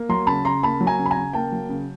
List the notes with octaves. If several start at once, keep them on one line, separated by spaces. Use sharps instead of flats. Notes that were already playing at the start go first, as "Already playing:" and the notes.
Already playing: A#3
F#3 A#5 C6
C#3 A5 B5
C#3 A#5 C6
A#3 A5 B5
F#3
G#5 A#5
C#3
B5
G#5 A#5
C#3
A#3 G5 A5
F#3
C#3